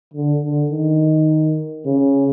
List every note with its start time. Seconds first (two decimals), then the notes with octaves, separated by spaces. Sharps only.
0.14 D3
0.42 D3
0.71 D#3
1.86 C#3